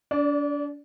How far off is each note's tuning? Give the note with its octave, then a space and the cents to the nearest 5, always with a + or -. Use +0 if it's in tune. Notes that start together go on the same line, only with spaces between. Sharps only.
D4 -35 D5 +0